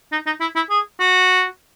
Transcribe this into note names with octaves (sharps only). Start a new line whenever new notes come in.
D#4
D#4
E4
E4
G#4
F#4